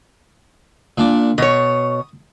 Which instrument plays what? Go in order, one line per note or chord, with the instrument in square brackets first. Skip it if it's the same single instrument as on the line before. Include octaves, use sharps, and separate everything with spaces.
[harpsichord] A#2 D4 D6
[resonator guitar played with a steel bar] B2 C#5 [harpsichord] D#6